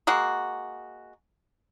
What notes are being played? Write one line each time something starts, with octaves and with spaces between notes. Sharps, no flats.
G#3 A#3 F#4